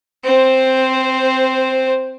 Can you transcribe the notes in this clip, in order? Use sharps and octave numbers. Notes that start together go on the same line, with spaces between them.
C4 C5